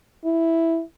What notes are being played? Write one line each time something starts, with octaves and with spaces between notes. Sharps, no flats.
E4